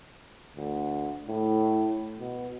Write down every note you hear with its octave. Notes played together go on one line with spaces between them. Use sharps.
D2
A2
B2